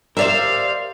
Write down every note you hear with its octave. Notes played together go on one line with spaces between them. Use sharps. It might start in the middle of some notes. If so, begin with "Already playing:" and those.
G4 A#4 C5 D5 E5 F5